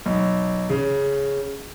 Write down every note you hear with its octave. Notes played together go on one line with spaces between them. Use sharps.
B1
C#3